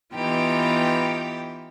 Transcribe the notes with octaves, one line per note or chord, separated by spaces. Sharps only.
E3 B3 D#4 F4 G4 G5